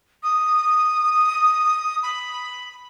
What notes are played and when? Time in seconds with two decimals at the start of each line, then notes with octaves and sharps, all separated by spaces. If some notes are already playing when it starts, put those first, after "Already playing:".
0.23 D#6
2.02 B5